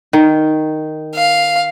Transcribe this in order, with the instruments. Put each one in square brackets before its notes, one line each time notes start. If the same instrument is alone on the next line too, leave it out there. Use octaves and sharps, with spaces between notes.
[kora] D#3
[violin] F5